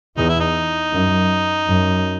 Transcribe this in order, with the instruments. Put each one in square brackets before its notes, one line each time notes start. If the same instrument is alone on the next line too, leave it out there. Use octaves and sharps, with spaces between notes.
[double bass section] E2 [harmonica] D#4
[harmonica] E4
D#4
[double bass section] F#2
F#2